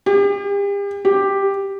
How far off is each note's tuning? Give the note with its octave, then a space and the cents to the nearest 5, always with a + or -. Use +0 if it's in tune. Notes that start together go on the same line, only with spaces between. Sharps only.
G4 +40
G4 +5